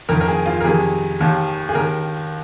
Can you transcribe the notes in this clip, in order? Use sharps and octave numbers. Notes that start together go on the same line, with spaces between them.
F2 D#3 A#4
A#4
G#4
F4
A#4
F2 C3 D#3 G#4
D#2 D#3
G#4
D#2 D#3 A#4